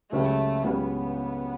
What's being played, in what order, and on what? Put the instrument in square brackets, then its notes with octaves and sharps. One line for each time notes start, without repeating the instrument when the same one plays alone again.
[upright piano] C#2 C#3 F#3 C#4 G4 [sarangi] A3
[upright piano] C#2 C#3 F#3 C#4 G4 [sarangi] B3